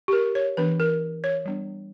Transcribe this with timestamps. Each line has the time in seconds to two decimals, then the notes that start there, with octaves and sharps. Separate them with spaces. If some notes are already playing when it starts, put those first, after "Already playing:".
0.08 G4
0.13 A#4
0.35 C#5
0.57 E3 B3 D4 B4
0.80 A#4
1.24 C#5
1.45 G3 B3 D4